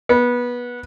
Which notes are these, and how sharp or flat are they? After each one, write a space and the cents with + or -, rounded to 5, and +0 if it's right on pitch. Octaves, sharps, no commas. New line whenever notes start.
B3 -20